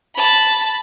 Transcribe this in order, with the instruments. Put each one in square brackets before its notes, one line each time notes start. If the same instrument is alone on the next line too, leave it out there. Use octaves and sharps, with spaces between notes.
[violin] A5 B5